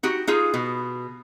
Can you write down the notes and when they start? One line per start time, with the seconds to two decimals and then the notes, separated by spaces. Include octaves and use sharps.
0.03 D#4 F#4 G4
0.27 D#4 F4 G#4
0.54 B2